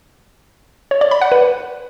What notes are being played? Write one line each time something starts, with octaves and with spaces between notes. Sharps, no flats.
C#5
D5
B5
F#5
B4